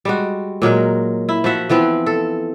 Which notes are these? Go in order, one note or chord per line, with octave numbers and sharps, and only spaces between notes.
G3 G#3 F#4
A#2 F#3 G#3 A#4
E4
F3 F#4 E5 F#5
E3 F3 B3 C4
A4